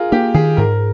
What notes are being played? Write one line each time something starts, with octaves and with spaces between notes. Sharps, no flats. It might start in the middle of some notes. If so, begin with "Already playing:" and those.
Already playing: F4 G#4 A#4
A#3 G4
D#3 G#4
G#2 A#4